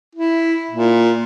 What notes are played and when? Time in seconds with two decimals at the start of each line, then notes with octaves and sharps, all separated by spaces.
0.15 E4
0.71 A#2